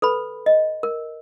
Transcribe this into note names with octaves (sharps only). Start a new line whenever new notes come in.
A4 B4 B5
D#5
A#4